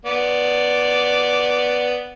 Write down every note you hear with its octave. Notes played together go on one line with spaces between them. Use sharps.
B3 D5